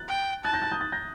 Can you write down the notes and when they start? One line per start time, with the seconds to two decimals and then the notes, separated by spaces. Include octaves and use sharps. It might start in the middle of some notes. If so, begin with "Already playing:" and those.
Already playing: F#6 A6
0.08 G5
0.44 A5 F#6 A6
0.53 G6 A#6
0.62 F#6 A6
0.71 D#6 G6
0.81 F#6 A6
0.92 G6 A#6